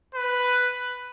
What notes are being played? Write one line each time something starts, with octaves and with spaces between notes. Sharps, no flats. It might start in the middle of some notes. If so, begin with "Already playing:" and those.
B4